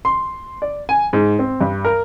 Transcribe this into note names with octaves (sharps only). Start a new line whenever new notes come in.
C6
D5
G#5
G#2
C4
G2
A#4